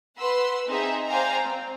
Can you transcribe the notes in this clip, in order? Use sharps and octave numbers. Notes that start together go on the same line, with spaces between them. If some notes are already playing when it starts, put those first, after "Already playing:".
B4 F#5 C6 E6
C4 D#4 G#4 E5
C5 D5 F5 G5 G#5 A#5
C4